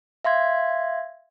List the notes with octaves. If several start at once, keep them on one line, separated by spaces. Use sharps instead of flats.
E5 F5 C6 G#6